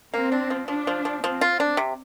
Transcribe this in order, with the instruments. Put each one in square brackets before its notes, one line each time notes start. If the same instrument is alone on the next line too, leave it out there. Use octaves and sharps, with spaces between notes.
[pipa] A#3 [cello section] C4
[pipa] D4
F3
[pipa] F3 [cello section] D4
[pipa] F3
F3
[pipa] F3 [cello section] C4
[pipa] F4
D4
C3